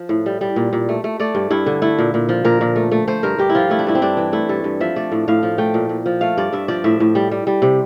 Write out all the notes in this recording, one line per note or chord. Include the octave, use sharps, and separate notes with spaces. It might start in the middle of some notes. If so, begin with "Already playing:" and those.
Already playing: F3
A2
G3
G3
A#2
A#2
A3
A3
A3 D5
G2
G2 E4
D3
A3 E4
A#2
A#2
F3
A#2 A#4
A#2
A3
A3
A3 C5
G2 A#4
G2 G4
E4
F3 F4
A3 E4
D4
G2 E4
C4
G2 D4
E3
A3 E4
G2 A4
G2
F3 E5
A3 D5
A2
A2 F5
F3
A3 G5
A#2
A#2
F3
A3 F5
G2 D5
G2 E5
F3 D5
A2 E5
A2
G3
G3
G3
C3